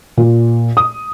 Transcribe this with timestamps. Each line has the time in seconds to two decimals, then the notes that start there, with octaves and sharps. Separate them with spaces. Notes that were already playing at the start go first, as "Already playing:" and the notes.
0.17 A#2
0.77 D#6